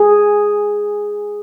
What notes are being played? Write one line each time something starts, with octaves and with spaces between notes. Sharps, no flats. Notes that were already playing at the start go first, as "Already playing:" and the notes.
Already playing: G#4